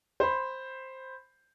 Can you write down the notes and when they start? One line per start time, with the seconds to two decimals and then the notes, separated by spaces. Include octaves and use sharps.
0.20 C5 B5